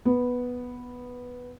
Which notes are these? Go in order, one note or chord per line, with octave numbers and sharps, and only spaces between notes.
B3